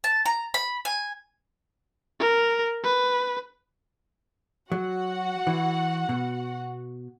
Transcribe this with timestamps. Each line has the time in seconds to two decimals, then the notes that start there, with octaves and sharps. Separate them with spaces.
0.04 A5
0.26 A#5
0.54 B5
0.85 G#5
2.20 A#4
2.84 B4
4.72 F#3 F#4 F#5
5.47 E3
6.09 B2